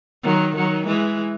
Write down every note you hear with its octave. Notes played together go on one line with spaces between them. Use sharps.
D#3 F#3
D#3 F#3
E3 G#3